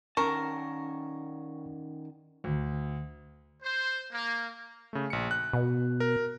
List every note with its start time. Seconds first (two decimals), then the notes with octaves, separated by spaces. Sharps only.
0.17 D#3 C#4 A#4 A5 C#6
2.44 D2
3.63 C5
4.11 A#3
4.93 C#3 A3
5.10 A#1 C#7
5.31 F#6
5.53 B2
6.00 A#4